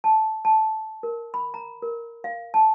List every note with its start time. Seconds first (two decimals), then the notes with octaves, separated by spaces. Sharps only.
0.04 A5
0.45 A5
1.03 A#4
1.34 B5
1.54 A#5
1.82 A#4
2.24 F5
2.54 A5